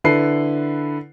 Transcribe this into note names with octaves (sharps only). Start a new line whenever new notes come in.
D3 E4 A4 B4 C7